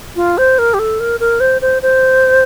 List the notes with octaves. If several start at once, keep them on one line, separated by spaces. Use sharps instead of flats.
F4
C5
A#4
G4
A4
A#4
A#4
C5
C5
C5